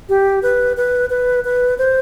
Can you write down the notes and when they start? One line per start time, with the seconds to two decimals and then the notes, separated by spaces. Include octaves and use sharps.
0.09 G4
0.43 B4
0.77 B4
1.10 B4
1.44 B4
1.78 C5